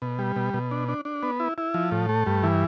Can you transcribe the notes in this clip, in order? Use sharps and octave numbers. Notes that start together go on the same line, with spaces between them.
B2
G3
B2
B2
D4
D4
D4
B3
E4
E4
F3
A2
A3
G2
E3